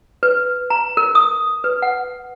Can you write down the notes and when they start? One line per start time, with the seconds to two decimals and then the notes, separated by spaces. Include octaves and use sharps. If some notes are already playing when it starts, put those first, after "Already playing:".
0.23 B4
0.70 A#5
0.97 A#4
1.15 D#6
1.64 B4
1.82 F#5